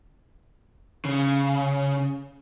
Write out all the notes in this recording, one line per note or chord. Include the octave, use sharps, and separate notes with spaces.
C#3